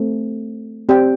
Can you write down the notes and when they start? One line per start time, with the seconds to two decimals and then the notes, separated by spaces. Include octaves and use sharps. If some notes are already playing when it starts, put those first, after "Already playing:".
Already playing: A3 C4
0.89 C4 G4 D5 G5